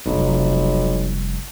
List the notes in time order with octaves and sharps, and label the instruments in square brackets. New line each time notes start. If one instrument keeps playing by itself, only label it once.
[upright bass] F1 G3 [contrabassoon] B1